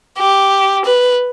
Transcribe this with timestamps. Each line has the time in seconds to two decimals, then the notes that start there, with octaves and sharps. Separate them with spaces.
0.18 G4
0.85 B4